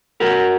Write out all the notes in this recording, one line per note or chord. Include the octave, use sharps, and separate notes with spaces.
B2 F#4 A#4